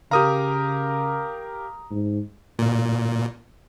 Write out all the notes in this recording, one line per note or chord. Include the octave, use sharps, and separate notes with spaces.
C#3 G4 A#4 F5 A#5 D#6
G#2
A#2